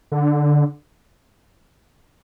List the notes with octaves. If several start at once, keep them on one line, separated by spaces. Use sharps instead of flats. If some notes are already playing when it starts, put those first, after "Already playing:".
D3